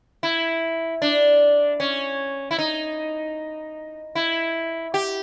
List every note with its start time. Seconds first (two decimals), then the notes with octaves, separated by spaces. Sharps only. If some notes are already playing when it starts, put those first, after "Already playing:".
0.23 E4
1.02 D4
1.80 C#4
2.51 E4
2.59 D#4
4.15 E4
4.94 G4